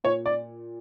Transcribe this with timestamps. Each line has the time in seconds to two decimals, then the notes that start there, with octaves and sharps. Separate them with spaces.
0.04 A#2 C#5
0.26 D5